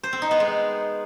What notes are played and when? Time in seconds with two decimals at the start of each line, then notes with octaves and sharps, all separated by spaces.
0.03 C5
0.13 C4
0.22 D#4
0.31 B3
0.40 G#3